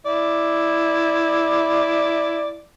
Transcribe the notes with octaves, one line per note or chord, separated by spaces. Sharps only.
E4 D5